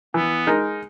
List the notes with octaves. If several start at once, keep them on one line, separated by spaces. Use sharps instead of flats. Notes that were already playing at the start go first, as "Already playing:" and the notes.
E3 B3
G#3 D#4 A#4